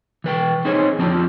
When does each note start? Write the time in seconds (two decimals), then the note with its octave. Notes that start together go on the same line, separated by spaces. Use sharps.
0.24 E3 B4 G5
0.65 C4 D#4 G#4 C5 C#5
0.99 F3 C4 D4 F4